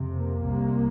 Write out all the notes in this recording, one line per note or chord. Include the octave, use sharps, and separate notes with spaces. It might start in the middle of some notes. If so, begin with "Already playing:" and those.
Already playing: F2 C3
A#3
C2 C3